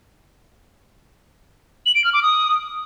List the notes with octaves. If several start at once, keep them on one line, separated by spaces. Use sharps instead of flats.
F#7
D7
F6
D6
D#6